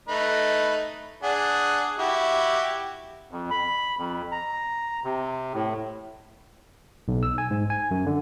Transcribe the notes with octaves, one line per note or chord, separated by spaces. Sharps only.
A3 D#4 B4
D4 G#4 F#5
E4 F#4 G4
F2
B5
F2
A#5
C3
A2
B1
E6
G#5
G#2
G#5
F#2
D3